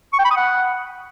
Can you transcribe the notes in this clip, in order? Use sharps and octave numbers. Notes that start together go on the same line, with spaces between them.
C#6
G5
B5
D#6
F#5